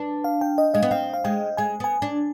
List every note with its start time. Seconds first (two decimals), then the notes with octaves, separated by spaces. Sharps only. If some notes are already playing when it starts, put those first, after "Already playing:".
Already playing: D4 B4
0.24 F5
0.41 G5
0.58 D#5
0.74 G#3 D#5
0.83 B3
0.91 C4 F5
1.14 F5
1.24 G#3 G5
1.57 G#3 G#5
1.80 B3 G#5
2.02 D4